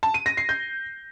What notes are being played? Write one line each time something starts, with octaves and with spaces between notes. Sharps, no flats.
A5
D#7
A#6
C7
G6